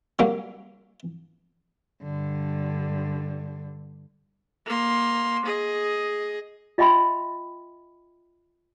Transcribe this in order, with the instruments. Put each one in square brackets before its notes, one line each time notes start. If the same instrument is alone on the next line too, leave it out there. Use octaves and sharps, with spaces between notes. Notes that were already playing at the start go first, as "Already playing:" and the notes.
[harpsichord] F#3 G3 A#3
[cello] G2 D3
[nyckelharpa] A#3 C6
G#4 D#5
[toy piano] F4 D#5 E5 G5 B5 C6